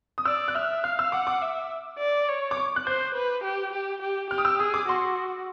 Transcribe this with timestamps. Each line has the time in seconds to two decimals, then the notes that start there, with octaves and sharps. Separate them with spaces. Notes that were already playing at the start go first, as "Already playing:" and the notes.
0.18 D#6
0.26 D5 E6
0.48 F#6
0.55 E5 F6
0.84 F5 F6
0.99 E6
1.12 F#5 D6
1.27 D6
1.42 E5
1.99 D5
2.29 C#5
2.51 D6
2.57 C#6
2.76 F#6
2.86 C5 G6
3.15 B4
3.44 G4
3.73 G4
4.02 G4
4.31 G4 F6
4.38 D#6
4.45 E6
4.59 G#4 D#6
4.74 D6
4.89 F#4 C6